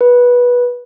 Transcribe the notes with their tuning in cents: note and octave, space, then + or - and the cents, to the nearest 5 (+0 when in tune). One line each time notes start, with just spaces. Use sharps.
B4 -15